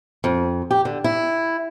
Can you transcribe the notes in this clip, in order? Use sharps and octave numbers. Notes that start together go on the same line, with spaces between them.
F2
G4
D3
E4